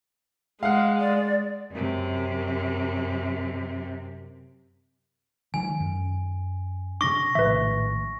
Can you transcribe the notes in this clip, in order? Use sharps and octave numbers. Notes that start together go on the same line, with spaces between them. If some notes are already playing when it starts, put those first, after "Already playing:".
G#3 F5 F#5
D5
F#2 C3
D#3 E3 F#3 G#5
F#2
C3 D4 C#6 D6 A#6
A#1 A2 D#3 B4 E5